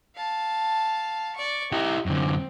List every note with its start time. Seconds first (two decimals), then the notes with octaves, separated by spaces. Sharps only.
0.16 F5 A5
1.36 D5 C#6
1.72 D#4 E4 G4
2.06 F#2 D3 C4